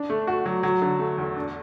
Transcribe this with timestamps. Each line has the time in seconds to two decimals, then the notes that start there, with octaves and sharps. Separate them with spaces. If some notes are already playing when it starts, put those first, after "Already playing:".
Already playing: D4
0.10 A3
0.27 F#4
0.46 F#3
0.63 F#3
0.82 D3
0.99 A3
1.18 E2
1.36 D4